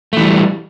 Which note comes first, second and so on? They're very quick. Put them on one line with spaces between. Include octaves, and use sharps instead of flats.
A3 E3 G3